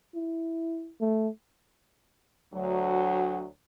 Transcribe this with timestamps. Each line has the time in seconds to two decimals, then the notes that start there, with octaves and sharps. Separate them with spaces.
0.15 E4
1.01 A3
2.53 D2 F#3